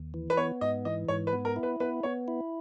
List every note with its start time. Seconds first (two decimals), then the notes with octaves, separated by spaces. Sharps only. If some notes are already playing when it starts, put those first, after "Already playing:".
Already playing: D#2
0.14 E3
0.30 B4
0.37 B3 C#5
0.61 G#2 D#5
0.85 E3 D#5
1.08 G#2 C#5
1.27 B4
1.33 B3
1.45 A#4
1.56 E4
1.63 B4
1.80 B3 B4
2.03 B3 C#5
2.28 E4